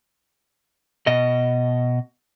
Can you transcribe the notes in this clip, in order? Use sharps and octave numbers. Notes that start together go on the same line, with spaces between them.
B2 D#5